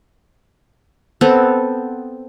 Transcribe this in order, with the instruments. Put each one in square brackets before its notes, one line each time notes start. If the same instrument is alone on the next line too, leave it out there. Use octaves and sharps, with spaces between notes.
[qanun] B3 C4 A4